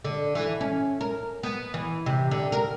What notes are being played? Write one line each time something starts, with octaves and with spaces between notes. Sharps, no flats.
D3
E3
C#4
A#4
B3
E3
C3
D3
A#4